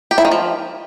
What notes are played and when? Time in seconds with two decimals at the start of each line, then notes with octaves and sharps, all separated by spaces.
0.11 G4
0.18 E4
0.25 D#3
0.31 F3